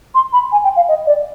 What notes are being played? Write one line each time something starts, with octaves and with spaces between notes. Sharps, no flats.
C6
B5
G#5
G5
F5
D#5
D5